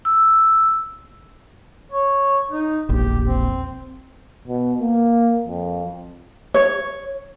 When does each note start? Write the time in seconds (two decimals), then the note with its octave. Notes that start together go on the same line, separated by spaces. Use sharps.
0.05 E6
1.92 C#5
2.52 D#4
2.89 E1 A#1 G4
3.25 C4
4.48 B2
4.82 A#3
5.48 F2
6.54 C#5